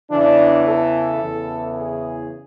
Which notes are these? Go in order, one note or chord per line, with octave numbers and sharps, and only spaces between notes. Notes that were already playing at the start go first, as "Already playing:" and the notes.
E2 C#3 E3 D4
A4
E2 C#3 E3
G#4